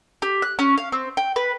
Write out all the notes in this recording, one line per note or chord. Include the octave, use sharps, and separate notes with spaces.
G4
F#6
C#4
F5
C4
G5
B4